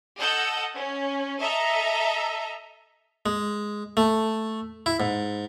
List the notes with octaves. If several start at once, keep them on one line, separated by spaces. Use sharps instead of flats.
A4 D#5 F#5 E6 G6
C#4
A4 D#5 E5 A#5
G#3
A3
E4
G#2